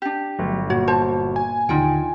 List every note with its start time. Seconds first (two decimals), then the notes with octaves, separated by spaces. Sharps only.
0.02 D4 G4
0.39 G1 F#3 A3
0.70 A#2 F#4 C#5
0.88 C5 A5
1.36 G#5
1.69 D#2 D3 D#4 F4 G5